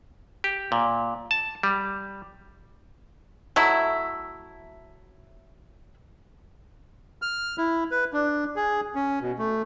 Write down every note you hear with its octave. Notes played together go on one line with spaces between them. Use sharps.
G4
A#2
A5
G3
F#3 A3 E4
F6
E4
B4
D4
G#4
C#4
B2
A3